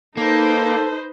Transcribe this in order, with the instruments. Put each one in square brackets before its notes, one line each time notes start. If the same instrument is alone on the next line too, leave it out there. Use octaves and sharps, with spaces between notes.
[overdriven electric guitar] A#3 [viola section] D#4 B4 C5 [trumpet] A4